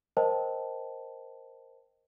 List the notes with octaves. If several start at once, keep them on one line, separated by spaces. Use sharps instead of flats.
A#4 C5 D#5 G5 A5